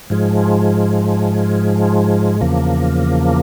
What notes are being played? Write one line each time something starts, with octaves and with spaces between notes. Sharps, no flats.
G#2 F3 G#3
E2 C#3 F3 A#3